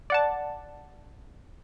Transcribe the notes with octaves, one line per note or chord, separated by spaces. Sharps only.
D5 F#5 A5